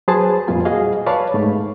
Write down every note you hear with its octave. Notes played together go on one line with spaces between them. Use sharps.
F#3 G#4 B4 C5 A5
F2 A#2 G3 F4 G#5
F#4 G#4 D#5 F5
B4 C#5 D5 F5 A5
G#2 A3